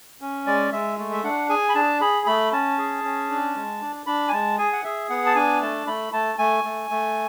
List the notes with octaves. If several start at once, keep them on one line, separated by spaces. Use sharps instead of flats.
C#4
G#3 D5
G#3 E5
A3
E5
D4 F#5
G#4 G#5
B5
D4 A5
G#4 B5
A3 B5
C#4 A5
G#4
C#4
D4
G#3
D4
D4 B5
G#5
G#3 A5
G#4 G#5
F#5
G#4 E5
B3 F#5
A5
D4 G#5
A3 A5
A3 B5
A3 A5
A3 G#5
A3
A3